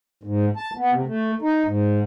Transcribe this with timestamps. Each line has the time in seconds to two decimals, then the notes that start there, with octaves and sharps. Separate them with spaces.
0.23 G#2
0.56 A5
0.77 B3
0.91 C3
1.07 A3
1.42 D#4
1.64 G#2